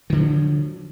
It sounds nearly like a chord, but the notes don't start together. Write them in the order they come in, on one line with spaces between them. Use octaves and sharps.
D#3 D3 F#3 F3